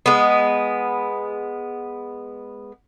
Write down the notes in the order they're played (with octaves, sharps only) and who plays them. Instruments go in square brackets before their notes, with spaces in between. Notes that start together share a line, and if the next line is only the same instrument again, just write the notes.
[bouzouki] G#3 B3